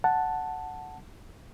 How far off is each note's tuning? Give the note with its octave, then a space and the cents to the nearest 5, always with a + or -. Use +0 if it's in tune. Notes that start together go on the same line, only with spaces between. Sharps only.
F#5 +0 A5 +0